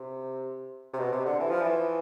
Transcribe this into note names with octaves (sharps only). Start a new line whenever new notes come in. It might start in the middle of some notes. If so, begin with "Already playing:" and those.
Already playing: C3
C3
B2
C3
D3
E3
F3
E3